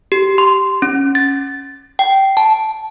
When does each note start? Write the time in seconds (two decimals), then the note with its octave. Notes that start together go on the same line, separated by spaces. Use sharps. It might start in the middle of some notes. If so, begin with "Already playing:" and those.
0.12 G4
0.38 C6
0.82 C#4
1.15 A6
1.99 G5
2.37 A5